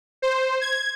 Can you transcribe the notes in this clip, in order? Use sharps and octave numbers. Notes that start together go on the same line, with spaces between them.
C5
G#6